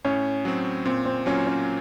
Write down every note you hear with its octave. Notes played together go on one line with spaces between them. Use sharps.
A2 C#4
F#3 C4
A#2 C4
C4
F#3 A#3 C#4 F4
C#4